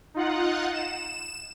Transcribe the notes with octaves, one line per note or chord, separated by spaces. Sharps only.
D#4 F4 F#5
E7